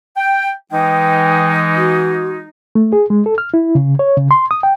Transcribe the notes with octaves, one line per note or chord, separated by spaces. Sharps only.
G5
E3 G#3 D#4 G5
F#4
A3
G#4
G#3
A4
F6
E4
C#3
C#5
C#3
C6
D#6
G5